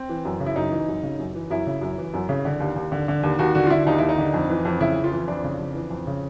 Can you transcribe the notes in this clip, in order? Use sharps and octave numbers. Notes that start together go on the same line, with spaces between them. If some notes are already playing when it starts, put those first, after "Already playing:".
Already playing: C4
E3
F#2
C#3
E4
F#2 D#4
E3
F#2
C#3
F#2
E3
F#2 E4
C#3
F#2
E3
F#2
C#3
D3
D#2
D#2
D3
D3
D#2
D#2 F#4
D3 F#4
F4
D3 E4
D#2 D#4
D#2 E4
D#4
D3
F2
E3
F2
C#3 E4
F2
F4
E3
F2 D4
C#3
F2
E3
F2
C#3